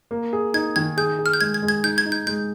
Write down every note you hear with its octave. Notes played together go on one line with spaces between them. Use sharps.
A#3
G#4
D#4 G#6
D#3 G#6
G#4 G6
G#4
F6
G6
G#3 G#6
G#6
G#3
G#6
D#4 G6
G#6
D#4
G6
G#3 G6